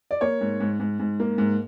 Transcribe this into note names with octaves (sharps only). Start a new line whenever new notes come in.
D5
A#3 C#5
G#2
G#2
G#2
G#2
A#3
G#2